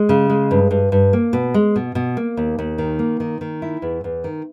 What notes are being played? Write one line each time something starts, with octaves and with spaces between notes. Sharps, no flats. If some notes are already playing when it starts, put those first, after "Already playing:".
Already playing: G#3
C#3
G#3
G2
G2
G2
A#3
B2
G#3
B2
B2
A#3
D#2
D#2
D#3
A#3
D#3
D#3
E4
E2
E2
D#3